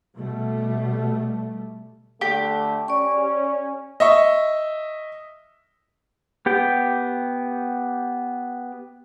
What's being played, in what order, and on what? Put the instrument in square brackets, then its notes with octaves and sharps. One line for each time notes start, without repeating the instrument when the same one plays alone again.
[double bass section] B2 G3 A3
[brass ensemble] D3 A3 [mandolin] G4
[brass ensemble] C#4 [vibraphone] D5 C#6
[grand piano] D#5 E5 C#6
[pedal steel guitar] B3 G4 G5